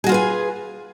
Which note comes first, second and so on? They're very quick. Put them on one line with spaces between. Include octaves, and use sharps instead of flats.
G#4 F#4 F4 B4 G#5